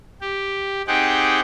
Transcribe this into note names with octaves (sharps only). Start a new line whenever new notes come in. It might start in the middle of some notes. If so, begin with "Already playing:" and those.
G4
C4 D#4 G4 G#4 F#5 G5